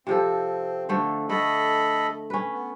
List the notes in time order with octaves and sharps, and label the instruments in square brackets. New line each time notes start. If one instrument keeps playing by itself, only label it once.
[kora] C3 F3 A4 [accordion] C4
[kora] D3 A3 C5
[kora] D3 A3 [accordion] A4 D#5 B5
[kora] C#4 B4
[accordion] B3